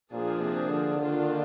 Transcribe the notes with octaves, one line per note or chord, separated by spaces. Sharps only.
A#2 F3 A#3 D4 G#4
C3
D3
D#3 A#3 D4 F4